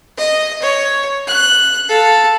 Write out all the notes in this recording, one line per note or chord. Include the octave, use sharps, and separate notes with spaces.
D#5
C#5
F#6
A4 F5